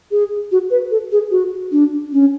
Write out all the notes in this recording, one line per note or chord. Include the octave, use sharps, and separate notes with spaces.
G#4
F#4
B4
A4
G#4
F#4
D4
C#4